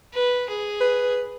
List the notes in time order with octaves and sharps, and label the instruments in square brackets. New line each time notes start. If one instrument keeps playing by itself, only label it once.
[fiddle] B4
G#4
[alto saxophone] B4